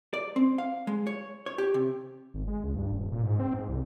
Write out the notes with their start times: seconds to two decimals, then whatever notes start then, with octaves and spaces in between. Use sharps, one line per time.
0.13 D5
0.36 C4
0.58 F5
0.87 G#3
1.07 C#5
1.46 C#5
1.58 G4
1.74 C3
2.34 G#1
2.47 G#3
2.64 C#2
2.76 G2
2.92 D#1
3.12 A#2
3.23 G#2
3.40 C4
3.54 G#2
3.69 C2